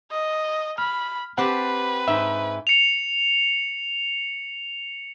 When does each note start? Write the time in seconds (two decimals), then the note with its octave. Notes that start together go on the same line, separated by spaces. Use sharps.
0.11 D#5
0.78 B5 F6
1.38 C4 G4 B4 F#5 A5
2.08 G#2 E5
2.67 C#7 F7